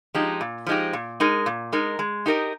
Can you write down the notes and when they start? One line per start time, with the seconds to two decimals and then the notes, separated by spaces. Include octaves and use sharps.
0.14 F3 G#3 D#4 G4
0.41 A#2
0.67 F3 G#3 D#4 G4
0.93 A#2
1.20 G#3 D#4 A#4
1.46 A#2
1.72 G#3 D#4 A#4
1.99 G#3
2.26 D#4 G4 A#4 D#5